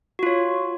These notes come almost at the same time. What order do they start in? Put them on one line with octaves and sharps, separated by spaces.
F#4 F4 C#5